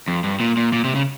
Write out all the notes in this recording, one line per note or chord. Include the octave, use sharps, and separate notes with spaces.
F2
G2
A#2
A#2
A#2
C3
C#3